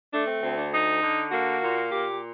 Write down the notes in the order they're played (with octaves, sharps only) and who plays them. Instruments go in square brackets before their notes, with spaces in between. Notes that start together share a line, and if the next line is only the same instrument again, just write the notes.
[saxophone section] A3 [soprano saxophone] D4
[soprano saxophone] C4
[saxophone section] D2 [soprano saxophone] C4
[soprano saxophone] D4
[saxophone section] D#4
D3
[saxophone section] A#3 [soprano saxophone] F#4
[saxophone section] A#2
[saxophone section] A#2 [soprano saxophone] G4